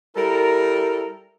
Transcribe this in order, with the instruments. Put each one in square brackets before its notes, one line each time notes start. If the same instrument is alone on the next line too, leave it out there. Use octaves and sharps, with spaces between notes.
[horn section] G3 E4 A4 A#4